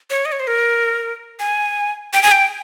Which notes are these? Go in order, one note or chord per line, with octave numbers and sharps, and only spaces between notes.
C#5
D#5
C#5
C5
A#4
G#5
G5
G#5
G5